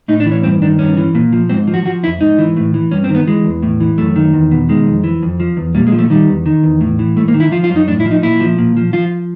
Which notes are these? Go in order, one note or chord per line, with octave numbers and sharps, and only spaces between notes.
A2 D#4
D4
E3
C#4
G2 C4
D#3 D4
G2 C#4
E3
A#2
F3
G#2 C4
F3
F#4
F3 F#4
F2 E4
G#2 D#4
E3
A2
E3
G2 C#4
C4
D#3
B3
E3 G#3
E2
A2
E3
F#2 A3
D#3
E2
B2
D#3 G#3
F2
E3
F2
F3
E2
A#2 G3
G#3
F3
A3
D#3 G3
E2
D#3
E2
A2
E3
G#2 A3
A#3
D#3
E4
F3 F4
F4
F#2
D#4
A2 D4
E4
F3
D#4
A#2 E4
F3
A#2
F3
F3 F4